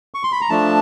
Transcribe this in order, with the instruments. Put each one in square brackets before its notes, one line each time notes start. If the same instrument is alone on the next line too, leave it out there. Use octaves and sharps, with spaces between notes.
[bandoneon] C#6
C6
B5
A#5
F3 A3 D4 A5